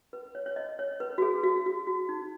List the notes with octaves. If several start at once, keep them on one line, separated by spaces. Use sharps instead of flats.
B4
C#5
C#5
D#5
C#5
B4
F#4
G#4
F#4
F#4
F#4
D#4